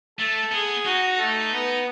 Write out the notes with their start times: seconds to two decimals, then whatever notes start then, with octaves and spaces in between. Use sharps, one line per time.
0.19 A3 A4
0.52 B3 G#4
0.85 D#4 F#4
1.17 A3
1.51 B3